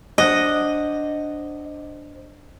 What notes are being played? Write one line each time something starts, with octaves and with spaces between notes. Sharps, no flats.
D4 C5 D5 D#5 F#5